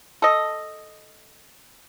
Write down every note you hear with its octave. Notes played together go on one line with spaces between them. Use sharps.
A4 D#5